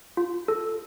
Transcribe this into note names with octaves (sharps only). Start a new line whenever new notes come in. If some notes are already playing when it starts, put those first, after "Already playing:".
F4
A4